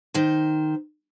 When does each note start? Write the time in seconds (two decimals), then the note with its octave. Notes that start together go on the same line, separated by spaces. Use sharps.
0.14 D#3 C5